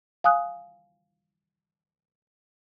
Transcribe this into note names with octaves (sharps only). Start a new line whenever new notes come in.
F5 G#5 D#6 F#6